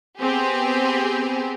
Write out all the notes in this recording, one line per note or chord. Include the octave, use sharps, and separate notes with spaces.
B3 C4 G4 G#4